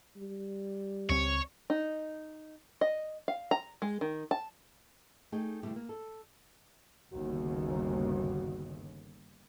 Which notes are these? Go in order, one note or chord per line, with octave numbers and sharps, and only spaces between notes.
G3
C#2 C4 C#5
D#4
D#5
F5
A#5
G#3
D#3
A5
A3 D#4 G#4 D5 G5
E2 B2 D3 G3 A3 G4
A#3
A4
G1 D#2 C#3 F#4